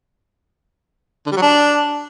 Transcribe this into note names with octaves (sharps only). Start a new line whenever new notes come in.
D3
G3
F#3
D4